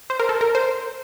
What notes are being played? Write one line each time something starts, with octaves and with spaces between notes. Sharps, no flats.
C5
A#4
A4
A#4
C5